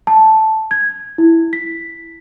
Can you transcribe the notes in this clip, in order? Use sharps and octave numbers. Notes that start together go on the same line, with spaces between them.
A5
G#6
E4
B6